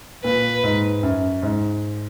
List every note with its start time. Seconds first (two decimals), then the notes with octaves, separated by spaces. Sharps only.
0.24 A#2 B4
0.63 G#2
1.03 F#2
1.42 G#2